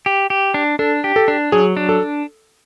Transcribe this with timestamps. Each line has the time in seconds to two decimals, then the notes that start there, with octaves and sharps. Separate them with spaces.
0.06 G4
0.30 G4
0.54 D4
0.79 D4 A4
1.04 G4
1.16 A4
1.28 D4
1.52 F#3 G#4
1.77 D4
1.89 A4